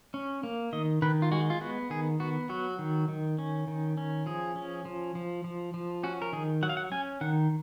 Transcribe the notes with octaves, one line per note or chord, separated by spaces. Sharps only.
C#4
A#3
D#3 D#5
D#3 B4
F4
G#3 F#4
F4
B3 F#4
D#3 G#4
B3 F#4
F#3 F#4
D#3
D#3
C#4
D#3
C#4
F3 G#4
C#4
F3
F3
F3
F3
C#4 F#4
A#4
D#3 G#4
F#3 F#5
F5
F#5
C#4 G#5
D#3 F#5